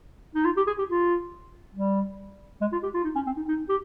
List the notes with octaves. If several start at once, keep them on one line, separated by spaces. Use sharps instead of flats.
D#4
F4
G4
G#4
G4
F4
G3
G#3
F4
G4
F4
D#4
C#4
C4
D#4
D#4
G4